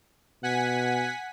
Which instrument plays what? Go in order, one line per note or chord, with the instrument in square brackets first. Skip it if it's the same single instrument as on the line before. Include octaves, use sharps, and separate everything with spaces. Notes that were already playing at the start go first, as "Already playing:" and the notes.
[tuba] B2 [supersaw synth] F#5 G#5 B6